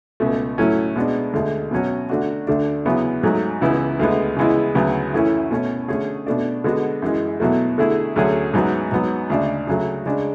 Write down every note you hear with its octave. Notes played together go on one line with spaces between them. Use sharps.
C#2 B2 A3
A2 F#3 A3 C#4 E4
B2 G#3 B3 D4
D2 D3 G#3
B2 F#3 C#4 F#4
D3 A3 D4 F#4
D2 D3 A3 D4
E2 C#3 F#3 B3
G#2 F#3 A3
C#2 C#3 E3 B3 E4
D2 D3 G#3 B3
C#3 E3 G#3 B3 E4
D2 C#3 F#3 B3 F#4
F#2 E3 A3 C#4 E4
B2 A3 C#4
D3 A3 C#4 G#4
B2 A3 D4
D3 G#3 B3 F#4
F#2 E3 G#3
E2 B2 F#3 A3
D3 A3 E4 G#4
D2 D3 F#3 C#4 G#4
G#2 F#3 B3
G#2 F#3 B3
D2 C#3 G#3 D4
C#3 F#3 A3
C#3 G#3 D4